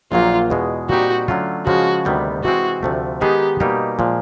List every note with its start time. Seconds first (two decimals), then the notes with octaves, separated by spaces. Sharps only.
0.12 A#1 A#2 F#3 A#3 F4
0.50 E2 B2 G#3
0.89 A#2 G3 C4 D#4 F#4 G4
1.28 D3 F#3 A3 C#4 F4
1.67 C#3 F3 G#3 F#4
2.05 D2 C3 D#3 G3 B3
2.44 C3 E3 G#3 C4 F#4
2.83 D2 C3 F3 A3
3.21 D#3 G#3 B3 D#4 G4 G#4
3.60 B2 G3 A#3 D#4 G4
3.99 A#2 F3 G#3